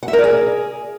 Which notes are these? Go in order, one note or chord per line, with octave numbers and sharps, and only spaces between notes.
F#5
E5
A#4
D5
G#4